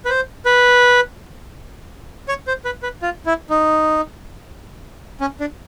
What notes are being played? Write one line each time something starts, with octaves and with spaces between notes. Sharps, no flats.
B4
C5
B4
C#5
C5
B4
B4
F4
E4
D#4
C#4
D4